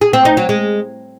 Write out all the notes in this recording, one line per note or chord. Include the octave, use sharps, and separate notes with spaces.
G#4
C4
D#4
F#3
G#3